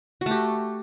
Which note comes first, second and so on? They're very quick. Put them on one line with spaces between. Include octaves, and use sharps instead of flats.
F#4 A3 G4